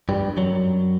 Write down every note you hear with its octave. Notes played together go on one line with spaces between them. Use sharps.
G2 G3
F#2 F#3